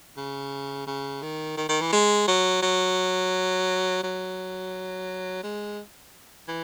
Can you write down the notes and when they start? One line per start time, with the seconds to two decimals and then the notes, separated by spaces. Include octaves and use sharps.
0.17 C#3
0.87 C#3
1.22 D#3
1.57 D#3
1.69 D#3
1.81 E3
1.93 G#3
2.28 F#3
2.62 F#3
4.03 F#3
5.43 G#3
6.49 E3